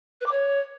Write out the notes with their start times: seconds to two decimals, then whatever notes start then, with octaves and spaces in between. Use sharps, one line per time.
0.21 B4
0.26 D6
0.31 C#5